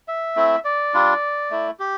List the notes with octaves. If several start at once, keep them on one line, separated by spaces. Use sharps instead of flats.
E5
A3 C4 E4
D5
G3 D4 F4
A3 E4
G4